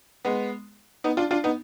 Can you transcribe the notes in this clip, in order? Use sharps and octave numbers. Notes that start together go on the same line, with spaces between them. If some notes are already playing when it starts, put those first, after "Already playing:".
G#3 B3
B3 D#4
D4 F4
D4 F4
B3 D#4